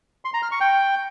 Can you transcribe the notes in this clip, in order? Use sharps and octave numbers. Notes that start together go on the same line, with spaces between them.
C6
A#5
F6
C#6
G5